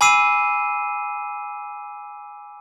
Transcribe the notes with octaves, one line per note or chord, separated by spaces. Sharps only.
G#5 B5 D6 E6 C7 D#7